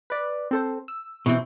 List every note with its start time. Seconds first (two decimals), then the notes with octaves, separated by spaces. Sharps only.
0.10 B4 D5
0.51 C4 A4 C5
0.88 E6
1.26 B2 E3 C4